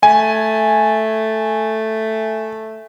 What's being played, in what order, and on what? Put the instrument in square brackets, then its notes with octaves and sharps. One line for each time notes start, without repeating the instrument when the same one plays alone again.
[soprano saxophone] A3 [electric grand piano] G#5